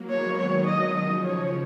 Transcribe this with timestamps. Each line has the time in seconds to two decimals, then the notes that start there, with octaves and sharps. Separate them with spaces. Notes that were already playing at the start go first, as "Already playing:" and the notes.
Already playing: F#3 A#3
0.10 G#3 B3 C#5
0.39 D#3 F#3 C#5
0.68 D#5
0.97 C#3 F3 D#5
1.26 C#3 C#5